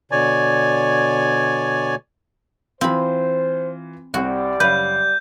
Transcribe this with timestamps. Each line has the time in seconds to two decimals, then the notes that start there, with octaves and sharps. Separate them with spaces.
0.11 B2 D3 C#5 D5 G#5
2.81 E3 C4 F4 C5 B5
4.14 C2 G3 C4 F#4 D5
4.60 F#1 B4 C#5 F5 G6